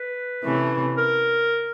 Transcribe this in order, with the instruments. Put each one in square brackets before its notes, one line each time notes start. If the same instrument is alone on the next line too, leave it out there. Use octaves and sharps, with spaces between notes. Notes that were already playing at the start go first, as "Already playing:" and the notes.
Already playing: [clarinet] B4
[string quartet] C3 E3 A3 C#4
[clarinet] A#4